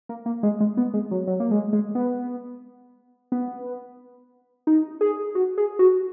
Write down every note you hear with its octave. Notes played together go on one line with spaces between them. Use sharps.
A#3
A#3
G#3
G#3
B3
G#3
F#3
F#3
A#3
G#3
G#3
B3
B3
D#4
G#4
F#4
G#4
F#4